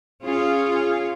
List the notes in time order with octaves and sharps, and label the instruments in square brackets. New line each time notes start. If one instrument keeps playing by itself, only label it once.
[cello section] C#4 F4 [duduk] G#4